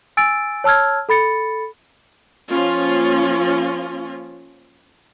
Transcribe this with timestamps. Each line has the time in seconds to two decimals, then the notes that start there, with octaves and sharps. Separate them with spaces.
0.17 G#5 E6 A6 D7
0.64 C#5 A5 E6 F6 G#6
1.09 A4 B5 A6 C#7
2.49 F3 A#3 C#4 F4